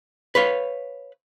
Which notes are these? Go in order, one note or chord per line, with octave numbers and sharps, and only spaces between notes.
B4 C#5 F5